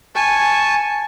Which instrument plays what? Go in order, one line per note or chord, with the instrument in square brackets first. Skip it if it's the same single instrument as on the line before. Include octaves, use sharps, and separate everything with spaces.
[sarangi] G#5 [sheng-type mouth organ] A5 C#6